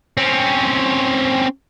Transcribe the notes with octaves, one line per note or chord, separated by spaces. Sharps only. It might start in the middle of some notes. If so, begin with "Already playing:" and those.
C4 C#4